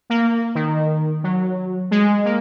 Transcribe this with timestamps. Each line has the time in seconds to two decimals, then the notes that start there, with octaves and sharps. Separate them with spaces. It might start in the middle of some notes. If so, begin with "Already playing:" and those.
0.10 A#3
0.55 D#3
1.24 F#3
1.91 G#3
2.25 A#3